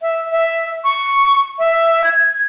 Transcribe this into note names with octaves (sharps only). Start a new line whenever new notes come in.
E5
E5
C#6
E5
G#6